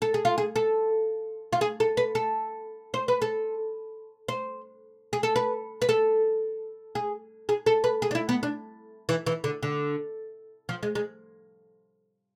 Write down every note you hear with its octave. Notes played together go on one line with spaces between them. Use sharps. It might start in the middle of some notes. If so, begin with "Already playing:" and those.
A4
G#4
F4
G#4
A4
F4
G#4
A4
B4
A4
C5
B4
A4
C5
G#4
A4
B4
B4
A4
G#4
G#4
A4
B4
G#4
D4
E4
B3
D4
E3
E3
D3
D3
F3
G#3
G#3